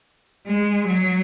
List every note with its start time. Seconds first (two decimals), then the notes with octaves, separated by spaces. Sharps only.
0.47 G#3
0.87 F#3